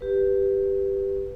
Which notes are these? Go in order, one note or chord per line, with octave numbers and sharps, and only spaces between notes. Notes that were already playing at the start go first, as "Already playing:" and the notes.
G4 B4